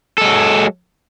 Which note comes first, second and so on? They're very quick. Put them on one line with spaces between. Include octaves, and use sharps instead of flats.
A4 G#3 F#3